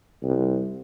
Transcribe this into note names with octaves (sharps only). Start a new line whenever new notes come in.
C2